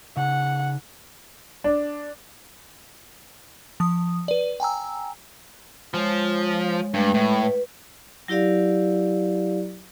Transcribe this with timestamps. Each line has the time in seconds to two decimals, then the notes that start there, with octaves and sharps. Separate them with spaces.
0.17 C#3 D#4 F#5
1.64 D4
3.80 F3 D#6
4.28 B4 D5
4.60 G5 G#5 A#5 E6
5.94 F3 G#3 C#5
6.94 G2 G#3 A3 B4
7.14 A2
7.42 B4
8.28 F#3 E4 G4 D5 F5